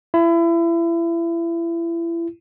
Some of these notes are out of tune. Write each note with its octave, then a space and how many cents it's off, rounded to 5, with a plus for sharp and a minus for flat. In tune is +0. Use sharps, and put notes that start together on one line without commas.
E4 +30